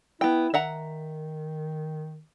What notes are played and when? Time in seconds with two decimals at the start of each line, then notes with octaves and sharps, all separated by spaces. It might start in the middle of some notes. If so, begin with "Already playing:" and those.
0.21 B3 E4 G5
0.54 D#3 E5 F#5 A#5